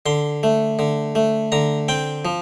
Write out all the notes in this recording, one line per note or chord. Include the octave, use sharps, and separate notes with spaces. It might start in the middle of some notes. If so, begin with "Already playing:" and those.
D3 C6
A3
D3
A3
D3 A#5
C4 G5
F3